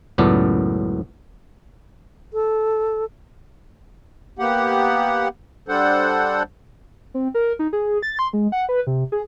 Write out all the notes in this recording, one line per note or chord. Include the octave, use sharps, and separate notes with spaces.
C#2 F#2 A2 B3 D5 A5
A4
A#3 B3 G4 F#5
G3 D4 A4 C5 F#5
C4
A#4
D#4
G#4
A6
C6
G#3
F#5
B4
C3
G#4